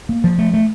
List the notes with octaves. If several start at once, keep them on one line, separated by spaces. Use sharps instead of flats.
A#3
F3
A3
A3